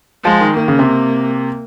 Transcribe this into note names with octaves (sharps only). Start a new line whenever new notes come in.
F3 G#3
D#3
D#3 A#3
C#3
C3